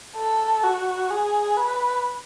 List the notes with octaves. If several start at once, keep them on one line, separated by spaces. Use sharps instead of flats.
A4
F#4
G#4
B4